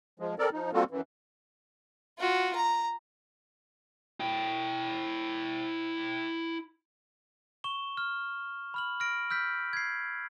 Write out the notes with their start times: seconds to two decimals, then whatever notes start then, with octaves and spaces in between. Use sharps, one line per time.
0.20 F3 G#3
0.39 C4 A4 A#4 D5
0.53 F3 D#4
0.73 G3 A#3 C4 F4 F#4 A4
0.91 F#2 E3
2.19 F4 F#4
2.55 A#5
4.20 E4 G5
7.64 C#6 E7 G7
7.97 F6
8.74 B5 F6 F#7
9.00 F6 A#6 D7
9.30 E6 F6 G6 B6
9.73 G#6 C7